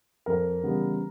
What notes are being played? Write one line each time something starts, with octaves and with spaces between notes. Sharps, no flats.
F2 A#4
C#3 E3 G3 B3